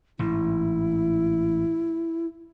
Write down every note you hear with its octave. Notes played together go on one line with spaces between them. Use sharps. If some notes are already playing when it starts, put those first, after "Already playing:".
A1 G#2 E4